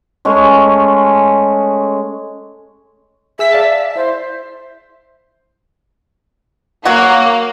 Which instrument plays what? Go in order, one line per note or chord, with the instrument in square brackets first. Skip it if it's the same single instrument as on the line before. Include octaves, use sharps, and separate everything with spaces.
[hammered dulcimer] G#3 A3 C#4 G#4
[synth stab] G#4 E6 B6 [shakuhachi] E5
[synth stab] D5 F5 A5
[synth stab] E4 [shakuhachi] C5
[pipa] F#3 F#4 [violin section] A#3